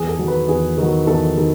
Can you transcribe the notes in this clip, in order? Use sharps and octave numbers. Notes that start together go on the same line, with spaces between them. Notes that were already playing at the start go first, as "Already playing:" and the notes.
Already playing: E2 G#4
A4
D#3 F#3
B4
E2 G#4
D#3 F#3
E2 A4
D#3